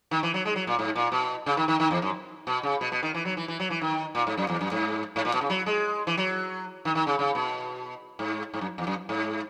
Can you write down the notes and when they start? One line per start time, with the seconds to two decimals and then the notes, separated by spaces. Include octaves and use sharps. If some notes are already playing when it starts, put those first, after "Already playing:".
0.11 D#3
0.23 E3
0.34 F#3
0.45 G#3
0.56 F#3
0.67 A#2
0.79 G#2
0.95 A#2
1.12 B2
1.46 C#3
1.57 D#3
1.68 D#3
1.80 D#3
1.91 E2
2.02 F#2
2.47 B2
2.63 C#3
2.81 B2
2.92 B2
3.03 D#3
3.14 E3
3.25 F#3
3.37 E3
3.48 E3
3.60 F#3
3.70 E3
3.81 D#3
4.15 A#2
4.27 G#2
4.37 F#2
4.49 E2
4.61 F#2
4.71 G#2
5.16 G#2
5.25 A#2
5.34 B2
5.41 C#3
5.50 F#3
5.66 G#3
6.07 E3
6.17 F#3
6.85 D#3
6.95 D#3
7.07 C#3
7.19 C#3
7.35 B2
8.19 G#2
8.54 G#2
8.61 F#2
8.78 E2
8.87 F#2
9.09 G#2